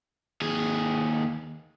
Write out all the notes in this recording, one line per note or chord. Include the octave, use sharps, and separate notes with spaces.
D#2 G#4